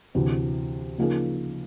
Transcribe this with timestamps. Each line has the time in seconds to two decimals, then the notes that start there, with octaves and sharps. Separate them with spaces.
0.15 D2 C3 E3
0.98 C#3 F3 A#3 D#4 G#4